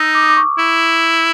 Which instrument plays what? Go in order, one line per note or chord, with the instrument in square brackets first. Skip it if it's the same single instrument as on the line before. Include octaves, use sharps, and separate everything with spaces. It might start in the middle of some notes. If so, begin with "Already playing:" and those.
Already playing: [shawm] D#4 [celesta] D#6 E6
[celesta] D6
D#6
D6
C#6
[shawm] E4